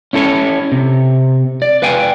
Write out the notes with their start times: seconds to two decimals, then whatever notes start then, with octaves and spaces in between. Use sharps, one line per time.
0.13 C#4 E4 A4 C5 C#5
0.72 C3
1.62 D5
1.82 B4 F5 G5 G#5